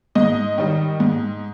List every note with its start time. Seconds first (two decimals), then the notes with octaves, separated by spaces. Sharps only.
0.15 G#2 D#5
0.58 D#3 G3
1.00 G#2